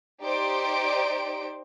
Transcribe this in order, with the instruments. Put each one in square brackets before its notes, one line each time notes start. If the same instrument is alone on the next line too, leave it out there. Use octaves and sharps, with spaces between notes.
[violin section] D#4 G4 C5 D5 D7